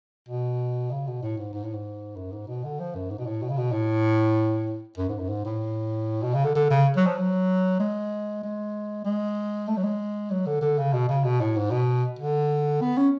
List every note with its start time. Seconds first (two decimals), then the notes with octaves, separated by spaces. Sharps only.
0.28 B2
0.91 C#3
1.07 B2
1.23 A2
1.38 G#2
1.53 G#2
1.63 A2
1.73 G#2
2.16 F#2
2.32 G#2
2.48 B2
2.64 D3
2.80 F3
2.95 F#2
3.10 G#2
3.18 B2
3.27 A2
3.42 B2
3.50 C#3
3.57 B2
3.72 A2
4.98 F#2
5.09 G#2
5.19 F#2
5.29 G#2
5.45 A2
6.23 B2
6.34 C#3
6.45 D3
6.55 D3
6.70 C#3
6.96 F#3
7.06 F3
7.18 F#3
7.79 G#3
8.43 G#3
9.05 G#3
9.68 A3
9.77 F#3
9.83 G#3
10.31 F#3
10.46 D3
10.61 D3
10.78 C#3
10.93 B2
11.09 C#3
11.24 B2
11.41 A2
11.56 G#2
11.71 B2
12.19 D3
12.81 B3
12.97 C#4